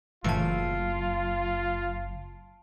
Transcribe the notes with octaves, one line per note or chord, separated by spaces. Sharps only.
F#1 A2 E3 F4 A5 D7